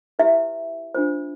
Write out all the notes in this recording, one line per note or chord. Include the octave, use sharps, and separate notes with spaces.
E4 G4 B4 E5
D4 F4 C5